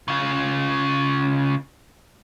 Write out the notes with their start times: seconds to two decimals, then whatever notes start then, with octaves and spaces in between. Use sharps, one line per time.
0.08 C#3 F4